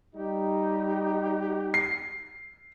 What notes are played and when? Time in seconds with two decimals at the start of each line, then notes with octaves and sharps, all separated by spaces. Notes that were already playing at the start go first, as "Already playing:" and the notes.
0.15 G3 D#4 G4
1.74 C7